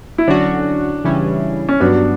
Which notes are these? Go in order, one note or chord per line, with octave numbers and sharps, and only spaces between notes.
E4
D3 F#3 C#4 D4 F#4
C#3 E3 G3 C#4 E4
C#4
G2 F#3 B3 D4 F#4